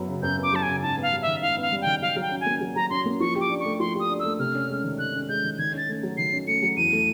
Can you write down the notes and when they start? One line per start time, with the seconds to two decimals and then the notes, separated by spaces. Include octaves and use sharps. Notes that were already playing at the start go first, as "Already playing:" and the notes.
Already playing: F#2 F#3 B3
0.08 C#3
0.23 F#2 G6
0.38 B3
0.43 D6
0.53 F#3 A5
0.62 G#5
0.68 C#3
0.82 G#2 A5
0.97 B3
1.02 F5
1.12 G3
1.22 E5
1.28 D#3
1.42 G#2 F5
1.57 B3 F5
1.72 G3
1.82 D#3 G5
2.02 F#3 F5
2.16 F#3
2.22 G5
2.31 C#4
2.40 G#5
2.46 A#3
2.61 F#3
2.76 F#3 A#5
2.90 C#4 C6
3.06 A#3
3.20 F3 C#6
3.35 G4
3.41 D6
3.50 D4
3.60 A3 C#6
3.80 F3 C6
3.95 G4 D#6
4.10 D4
4.20 A3 E6
4.39 C3 F6
4.54 C#4
4.69 G#3
4.84 D#3
4.98 C3 F#6
5.14 C#4
5.29 G#3 G6
5.44 D#3
5.58 D#3 G#6
5.73 C#4 A6
5.88 A3
6.03 F#3
6.17 D#3 C7
6.32 C#4
6.47 A3 C#7
6.62 F#3
6.77 E2 D#7
6.92 A3